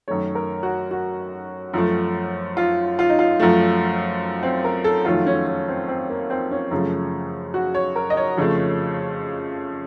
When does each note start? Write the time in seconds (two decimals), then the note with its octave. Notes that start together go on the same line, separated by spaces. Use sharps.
0.08 F#2 D#3 A3 C#5
0.35 A#4
0.63 F#4
0.91 F#4
1.73 F#2 F3 A3
2.57 F4
2.99 F4
3.09 D#4
3.19 F4
3.40 F#2 F3 A3
4.43 C4
4.64 A#4
4.84 A4
5.05 F2 D#3 F#3 A3 F4
5.26 C#4
5.47 C#4
5.68 C4
5.88 C4
6.09 A#3
6.30 C4
6.51 C#4
6.71 F#2 C#3 F3 A3
7.54 F#4
7.74 C#5
7.96 A#4
8.10 D#5
8.17 C#5
8.37 F2 C#3 F3 A3